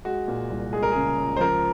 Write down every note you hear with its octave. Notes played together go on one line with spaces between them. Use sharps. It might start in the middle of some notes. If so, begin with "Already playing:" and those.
G#3 F#4
A#2
C2
G#3 G#4
A#4
C#3 G#4
C#2
C5
F3 A#4